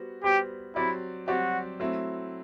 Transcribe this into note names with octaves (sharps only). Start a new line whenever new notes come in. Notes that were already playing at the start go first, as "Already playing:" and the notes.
Already playing: G3 B3 F#4 C5
G3 B3 F#4 G4 C5
F#3 C4 E4 G4 D5
F#3 C4 F#4 G4 D5
F#3 A3 C4 E4